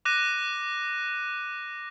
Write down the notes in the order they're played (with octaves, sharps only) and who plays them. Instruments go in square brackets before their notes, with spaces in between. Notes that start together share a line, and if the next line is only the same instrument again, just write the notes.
[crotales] D6 F#6 A#6 D#7